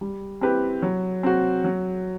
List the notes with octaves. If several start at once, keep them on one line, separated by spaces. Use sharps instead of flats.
G3
C4 E4 G4 B4
F#3
C4 F#4
F#3